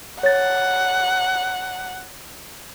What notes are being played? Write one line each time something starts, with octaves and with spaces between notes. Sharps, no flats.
C#5 F#5 A6